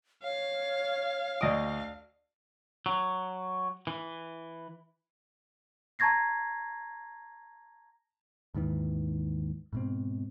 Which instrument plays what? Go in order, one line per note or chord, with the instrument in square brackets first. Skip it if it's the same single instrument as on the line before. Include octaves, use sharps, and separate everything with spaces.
[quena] C#5 [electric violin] F5
[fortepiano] D2 D#5 D#6 [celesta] D5 A#6 D7
[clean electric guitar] F#3
E3
[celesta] A5 A#5 C#6 G#6 A#6 C7
[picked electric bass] D#2 G#2 D#3 E3
G#2 B2 C4